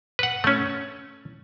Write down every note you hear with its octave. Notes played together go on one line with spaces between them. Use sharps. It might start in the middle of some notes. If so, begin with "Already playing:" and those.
B4 F#5
A3 C#4